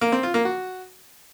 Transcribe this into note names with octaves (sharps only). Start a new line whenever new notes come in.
A#3
C4
F4
A#3
F#4